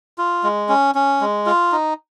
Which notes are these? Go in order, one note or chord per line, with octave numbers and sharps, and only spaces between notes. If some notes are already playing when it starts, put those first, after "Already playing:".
F4
G#3
C#4
C#4
G#3
F4
D#4